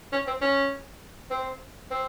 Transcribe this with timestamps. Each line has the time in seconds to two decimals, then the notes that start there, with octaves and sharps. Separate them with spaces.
0.12 C#4
0.27 C4
0.41 C#4
1.30 C4
1.91 C4